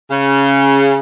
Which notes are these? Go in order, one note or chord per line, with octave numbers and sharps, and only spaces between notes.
C#3